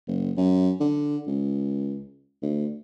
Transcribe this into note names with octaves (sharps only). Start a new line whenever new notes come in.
F#1
F#2
D3
C#2
D2